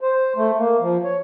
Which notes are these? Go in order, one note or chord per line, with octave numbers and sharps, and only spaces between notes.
C5
A3
A#3
F3
C#5